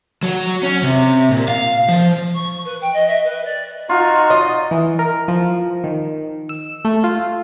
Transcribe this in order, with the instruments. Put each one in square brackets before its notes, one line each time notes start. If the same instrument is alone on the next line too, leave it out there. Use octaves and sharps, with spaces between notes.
[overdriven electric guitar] F#3
C#4
C3
A#2
F5
F3
[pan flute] C#6
B4
G5
D#5
E5
B4
D5
[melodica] D#4 F#4 [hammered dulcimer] F4
[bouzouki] D#5
[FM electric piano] E3
A#4
F3
D#3
E6
A3
F4